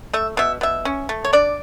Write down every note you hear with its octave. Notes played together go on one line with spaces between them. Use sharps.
A3 E5
B2 E5
B2 E5
C#4
A3
C#5
D4 D5